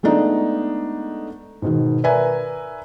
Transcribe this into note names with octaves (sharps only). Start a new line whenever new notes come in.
G#3 A3 B3 D4 D#4
G#2 B2 D#3
A#4 B4 D5 E5 G#5 A#5